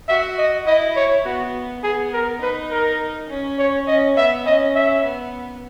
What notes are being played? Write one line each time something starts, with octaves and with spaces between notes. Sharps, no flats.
F#4 E5
D#5
E4 D#5
C#5
B3 F#4
B3 G#4
A#4
D#4 B4
A#4
C#4
C#5
C#4 D#5
B3 E5
C#4 D#5
E5
B3